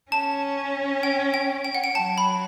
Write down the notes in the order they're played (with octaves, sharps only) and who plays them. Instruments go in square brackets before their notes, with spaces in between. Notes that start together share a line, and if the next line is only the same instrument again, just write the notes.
[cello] C#4 [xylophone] A5
[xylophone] G5
G5
G5
F#5
G5
[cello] F#3 [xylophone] A5
[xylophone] B5